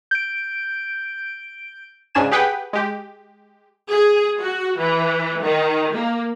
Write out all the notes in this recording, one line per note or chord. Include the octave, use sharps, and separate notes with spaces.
G6 D7
G#2 C#3 D4 G#5 E7
G4 G#4 B4 F#5 G5
G#3 G4
G#4
F#4
E3
D#3
A#3